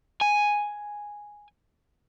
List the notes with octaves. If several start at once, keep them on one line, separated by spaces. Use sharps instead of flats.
G#5